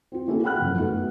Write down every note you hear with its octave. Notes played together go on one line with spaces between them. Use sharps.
C4 F4
A#3 C#4 E4 F#4 G#4 A4
F#5 G5 B5 F6 F#6
F#2 C#3 F3
A3 B3 D#4 F#4 A4